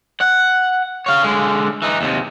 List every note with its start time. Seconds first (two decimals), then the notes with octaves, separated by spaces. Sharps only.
0.21 F#5
1.06 C#5 F5
1.23 D3 G#3
1.82 E3 D#4
2.01 D#2 C3